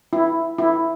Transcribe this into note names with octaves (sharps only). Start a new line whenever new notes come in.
E4
E4